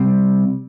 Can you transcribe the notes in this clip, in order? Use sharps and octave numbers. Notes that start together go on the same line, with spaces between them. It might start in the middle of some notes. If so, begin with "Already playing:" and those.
Already playing: C3 G3 C4